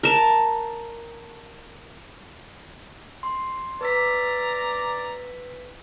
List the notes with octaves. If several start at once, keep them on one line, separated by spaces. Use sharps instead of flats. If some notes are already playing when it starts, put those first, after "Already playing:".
A#4 A5
C6
B4 D5 A#5 E6 B6